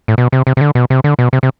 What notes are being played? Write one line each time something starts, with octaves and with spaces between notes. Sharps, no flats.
A2
B2
C3
C3
C3
D3
B2
C3
D3
B2
C3
C3